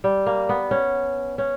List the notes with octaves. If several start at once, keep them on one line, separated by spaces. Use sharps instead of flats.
G3
A#3
B3
C#4
C#4